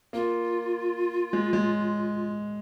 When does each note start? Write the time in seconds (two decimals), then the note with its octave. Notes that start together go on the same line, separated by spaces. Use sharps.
0.13 A#3 F4
1.33 G#3
1.53 G#3